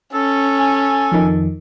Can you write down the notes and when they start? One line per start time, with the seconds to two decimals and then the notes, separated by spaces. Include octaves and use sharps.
0.14 C#4 A4
0.59 G#5
1.12 F2 D#3